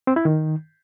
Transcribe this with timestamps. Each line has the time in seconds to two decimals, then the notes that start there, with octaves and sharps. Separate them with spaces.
0.07 C4
0.16 E4
0.25 D#3